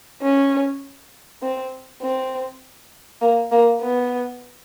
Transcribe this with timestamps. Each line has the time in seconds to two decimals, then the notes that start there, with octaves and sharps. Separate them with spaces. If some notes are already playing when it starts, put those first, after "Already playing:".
0.22 C#4
1.42 C4
2.02 C4
3.22 A#3
3.52 A#3
3.81 B3